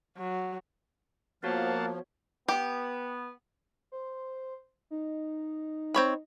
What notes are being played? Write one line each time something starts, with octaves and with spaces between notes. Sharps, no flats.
F#3
F3 A#3 B3 F#4 C#5 F5 F#5 A5
B3 G4
C5
D#4
C4 C#5 B5